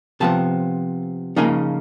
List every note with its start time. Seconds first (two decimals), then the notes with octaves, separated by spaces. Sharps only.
0.20 C3 F3 B3 A5
1.36 C#3 F3 A#3 D#4 G#5